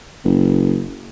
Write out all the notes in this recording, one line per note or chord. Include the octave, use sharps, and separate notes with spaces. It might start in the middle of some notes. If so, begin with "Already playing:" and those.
F#1